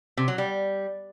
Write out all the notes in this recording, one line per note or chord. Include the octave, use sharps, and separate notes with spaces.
C3
F#3
G3